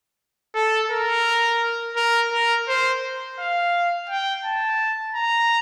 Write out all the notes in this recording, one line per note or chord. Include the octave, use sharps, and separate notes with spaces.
A4
A#4
A#4
A#4
C5
F5
G5
A5
A#5